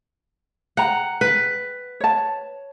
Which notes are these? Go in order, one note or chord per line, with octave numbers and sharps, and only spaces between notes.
F#5 G5 A#5
B4
C#5 A5